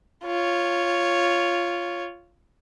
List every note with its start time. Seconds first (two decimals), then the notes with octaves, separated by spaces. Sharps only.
0.24 F4 C#5